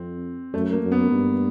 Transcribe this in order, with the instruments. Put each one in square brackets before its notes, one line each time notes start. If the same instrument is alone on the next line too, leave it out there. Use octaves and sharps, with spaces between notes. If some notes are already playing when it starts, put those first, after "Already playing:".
Already playing: [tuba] F2 [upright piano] C4
[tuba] F#2 [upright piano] A3
[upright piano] A#3
[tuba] F#2
[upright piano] B3
[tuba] G2